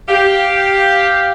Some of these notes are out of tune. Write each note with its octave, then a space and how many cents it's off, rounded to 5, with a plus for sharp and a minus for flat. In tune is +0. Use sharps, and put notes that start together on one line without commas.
G4 +0 F5 +0